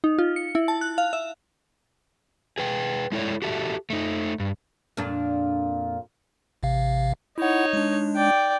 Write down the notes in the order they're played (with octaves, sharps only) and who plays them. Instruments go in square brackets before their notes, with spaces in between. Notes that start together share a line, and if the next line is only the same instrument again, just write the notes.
[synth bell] D#4
F4
C#7
E4
A5
F#6
F5
E5
[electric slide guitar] G#4 B4 G5
G#3 E4 A4 C#5 D5
F#4 G4 A4 E5
A3 D#4
G2
[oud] F2 A#2 D4
[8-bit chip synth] A1 C3 F5
[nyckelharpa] D#4 C#5 [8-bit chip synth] E4 F#5
[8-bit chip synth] G#3 D4
[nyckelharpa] D5 G5